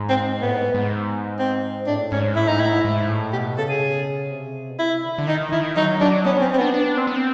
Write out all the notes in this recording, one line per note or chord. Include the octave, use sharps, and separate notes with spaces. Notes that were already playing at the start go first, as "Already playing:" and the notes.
Already playing: G#2
C4
A2 B3
G#2
G#2
C4
A2 D4
G#2 C#4
A2 E4
G#2 D#4
A2 E4
G#2
G#2
A2
B2 G4
C#3 A4
G#4
C3
B2
C3 E4
D3
D3
D#3 D#4
D#3 E4
F#3 D#4
F#3 D4
B3 C#4
C4 C#4
C4
B3 D4
D4
C4
B3
C4